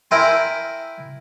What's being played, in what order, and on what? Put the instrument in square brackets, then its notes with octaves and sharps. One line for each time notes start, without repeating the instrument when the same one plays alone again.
[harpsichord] E4 A#4 E5 G5 G#5 C6